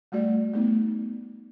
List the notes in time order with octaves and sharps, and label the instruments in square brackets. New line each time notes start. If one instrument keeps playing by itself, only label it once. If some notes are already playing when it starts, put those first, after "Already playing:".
[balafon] G3 A3 F#4 D5
A3 B3 D#4